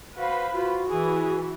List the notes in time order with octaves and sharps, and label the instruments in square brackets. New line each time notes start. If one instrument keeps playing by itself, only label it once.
[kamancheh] F#4 F5 [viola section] B4 C5 B5
[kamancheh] F4 [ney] F#4
[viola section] E3 [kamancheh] G#4